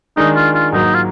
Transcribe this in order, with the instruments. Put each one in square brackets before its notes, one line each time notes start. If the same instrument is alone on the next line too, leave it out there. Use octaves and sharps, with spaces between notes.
[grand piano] D#3 G#3 D4 [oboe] D#4
[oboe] F4
F4
[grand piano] G#2 F#3 A#3 [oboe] D#4
[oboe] F4